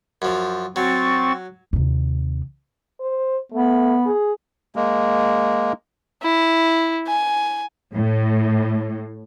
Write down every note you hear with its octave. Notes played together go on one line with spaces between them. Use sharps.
F#2 F3
F#3 C4 C#6 A6
D#2 C3
C5
A3 B3
G#4
G#3 A#3
E4
G#5
A2